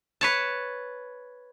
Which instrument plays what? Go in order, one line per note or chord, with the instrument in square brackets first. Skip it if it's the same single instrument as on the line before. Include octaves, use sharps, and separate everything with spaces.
[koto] B4 C#5 A5